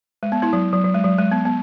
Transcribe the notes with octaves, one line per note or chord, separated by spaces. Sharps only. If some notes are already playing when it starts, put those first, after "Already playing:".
G#3
B3
B3 E4
F#3
F#3
F#3
G#3
F#3
G#3
B3
B3